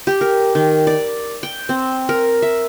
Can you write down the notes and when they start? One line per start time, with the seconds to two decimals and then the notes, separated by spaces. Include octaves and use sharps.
0.07 G4
0.21 A#4
0.55 D#3
0.87 D5
1.43 G5
1.69 C4
2.09 A#4
2.42 E5